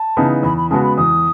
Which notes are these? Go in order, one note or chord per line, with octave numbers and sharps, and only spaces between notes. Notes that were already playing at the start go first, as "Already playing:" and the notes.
Already playing: A5
C#3 E3 B3 D#4
E2 B5
B5
C#3 G#3 B3 F#4 A5
B5
E2 D#6